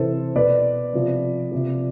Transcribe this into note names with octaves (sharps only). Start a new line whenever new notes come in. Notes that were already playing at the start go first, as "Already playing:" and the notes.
Already playing: C3 E3 A4 C5
B2 B4 D5
C3 F3
C3 F3